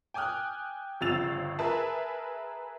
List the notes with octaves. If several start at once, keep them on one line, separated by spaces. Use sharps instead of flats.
G5 G#5 D6 D#6 F6 F#6
G1 C#3 F3 E6 A6 F7
G#4 A#4 B4 E5 A5